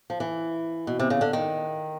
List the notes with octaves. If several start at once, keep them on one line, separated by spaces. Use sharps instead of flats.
F3
E3
B2
C3
C#3
D3
D#3